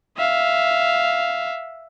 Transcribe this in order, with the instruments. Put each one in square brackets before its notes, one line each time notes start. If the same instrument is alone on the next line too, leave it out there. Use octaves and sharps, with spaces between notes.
[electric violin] E5 F5